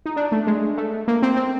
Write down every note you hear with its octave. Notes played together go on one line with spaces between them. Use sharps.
D#4
D4
A3
G#3
A3
A#3
C4
C4